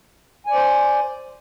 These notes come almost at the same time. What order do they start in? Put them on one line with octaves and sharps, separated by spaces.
G#5 D5 C5